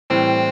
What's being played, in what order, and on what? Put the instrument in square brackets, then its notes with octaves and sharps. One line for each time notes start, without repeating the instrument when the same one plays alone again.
[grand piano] A2 E3 G3 [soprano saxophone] C4